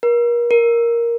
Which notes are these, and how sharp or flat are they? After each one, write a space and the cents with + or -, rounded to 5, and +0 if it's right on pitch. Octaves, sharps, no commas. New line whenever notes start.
A#4 +35
A#4 +5